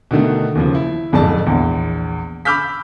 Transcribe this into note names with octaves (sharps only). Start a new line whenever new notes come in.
B2 D3 D#3 A3
D#2 C#3 F3
E4
D1 F2 G#2 D5 A5
A#1 E2
B5 D6 E6 F6 G6 B6